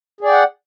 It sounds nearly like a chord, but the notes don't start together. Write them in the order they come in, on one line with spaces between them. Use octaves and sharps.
G#4 D5 G5 F#5